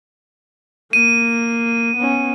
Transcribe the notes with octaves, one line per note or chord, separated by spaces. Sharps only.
A#3 D#7
B3 C#4